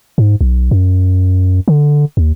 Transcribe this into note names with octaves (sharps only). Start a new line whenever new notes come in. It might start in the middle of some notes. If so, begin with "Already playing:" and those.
G#2
B1
F#2
D3
D#2